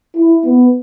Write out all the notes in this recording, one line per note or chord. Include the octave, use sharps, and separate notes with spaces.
E4
B3